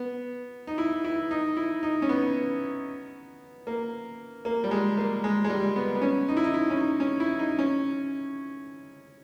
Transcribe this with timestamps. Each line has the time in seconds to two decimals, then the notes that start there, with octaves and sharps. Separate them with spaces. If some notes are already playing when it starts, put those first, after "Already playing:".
Already playing: B3
0.67 D#4
0.78 E4
1.05 E4
1.31 D#4
1.57 E4
1.83 D#4
2.02 C#4
2.09 B3
3.67 A#3
4.45 A#3
4.64 G3
4.71 G#3
4.97 A#3
5.24 G#3
5.44 G#3
5.49 G3
5.76 B3
5.95 B3
6.02 C#4
6.28 D#4
6.37 E4
6.44 D#4
6.54 E4
6.70 C#4
6.81 D#4
7.00 C#4
7.20 E4
7.39 D#4
7.59 C#4